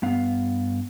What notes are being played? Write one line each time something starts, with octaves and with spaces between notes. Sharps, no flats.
G2 B3 F5